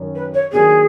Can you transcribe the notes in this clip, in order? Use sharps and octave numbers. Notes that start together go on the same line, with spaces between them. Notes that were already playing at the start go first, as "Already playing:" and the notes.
Already playing: F#2 D#3
B4
C#5
D#3 F#3 A#3 D4 G4 G#4